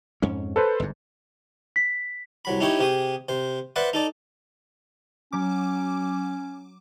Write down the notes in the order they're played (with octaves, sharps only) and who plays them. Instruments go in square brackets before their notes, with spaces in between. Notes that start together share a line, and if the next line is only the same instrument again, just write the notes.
[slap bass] F2 G#2 C#4
[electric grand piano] A4 B4 C5
[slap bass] G1 G#2
[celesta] B6
[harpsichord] C2 F#3 B5
C#4 D#4 E4 G4 C#5
C3 G4 G#4 D#6
C3 C5
B4 C5 D5 E5 F#5
D#4 A4 D5
[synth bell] F#3 D6 [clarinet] C#4